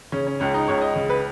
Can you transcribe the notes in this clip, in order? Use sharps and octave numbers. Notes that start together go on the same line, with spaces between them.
C#3 C#4
C#4
C#2 C#4
D#4
C#2 C#5
D#5
C#3
B4